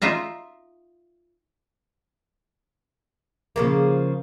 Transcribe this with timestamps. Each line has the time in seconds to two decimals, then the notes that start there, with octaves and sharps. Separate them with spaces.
0.02 D#4 F4 E5 A#5
3.56 C#3 F3 A#3